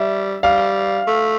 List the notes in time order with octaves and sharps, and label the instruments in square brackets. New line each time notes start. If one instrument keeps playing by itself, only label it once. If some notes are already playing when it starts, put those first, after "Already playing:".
Already playing: [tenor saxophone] G3 [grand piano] E5
[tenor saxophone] G3 [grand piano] F5
[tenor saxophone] A3